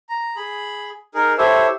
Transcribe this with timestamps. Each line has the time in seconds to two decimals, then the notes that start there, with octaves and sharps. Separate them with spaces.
0.09 A#5
0.36 G#4 B5
1.14 D#4 G#4 A#4
1.38 E4 G4 A4 C5 C#5 E5